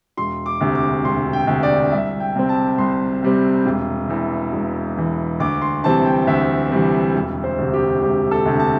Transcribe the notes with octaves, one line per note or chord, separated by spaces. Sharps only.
E1 C6
D6
D2 C3
D6
E1 C6
G5
D2 C3
D5
C2 E5
G5
C3 G3 C4
A5
C2 C6
C3 G3 C4
E1
E2 E3
E1
E2 E3
D2 D6
C6
C3 E3 G3 C4 A5
G5
D2 E5
C3 E3 G3 C4
E1
C5
D2 C3
G4
E1 G4
A4
D2 C3
A5